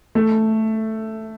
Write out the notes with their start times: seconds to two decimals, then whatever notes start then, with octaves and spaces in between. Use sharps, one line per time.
0.15 A3